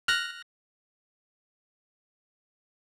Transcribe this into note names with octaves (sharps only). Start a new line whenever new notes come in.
F6 F#6 A#6